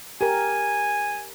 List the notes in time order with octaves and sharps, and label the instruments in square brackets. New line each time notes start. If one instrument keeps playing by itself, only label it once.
[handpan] G4 A#4 [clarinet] G#5